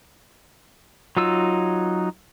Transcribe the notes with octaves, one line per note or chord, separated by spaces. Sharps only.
F#3 D#4 F4 E6